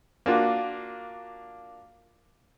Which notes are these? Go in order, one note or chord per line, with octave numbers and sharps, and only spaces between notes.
A#3 D4 F4 F#4